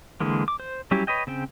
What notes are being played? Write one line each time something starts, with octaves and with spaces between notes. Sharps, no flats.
D3 E3 G#3 A#3
D6
C5
F#3 G3 C#4 E4 G4
B4 C#5 D#5 G5
C#3 C4 G5